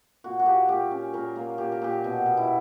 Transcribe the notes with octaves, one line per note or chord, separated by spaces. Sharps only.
A#2 F#4
F#4
A#3 G4
A#2 G4
C#4
A#2 A#4
A#3
A#2 G4
A#4
A#2 G4
B2
B2
E4